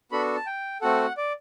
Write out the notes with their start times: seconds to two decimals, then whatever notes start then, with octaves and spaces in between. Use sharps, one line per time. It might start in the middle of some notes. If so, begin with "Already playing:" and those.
0.12 B3 D4 F#4 A4 B5
0.36 A5
0.46 G5
0.81 A3 C4 F#4 A4 F#5
1.17 D5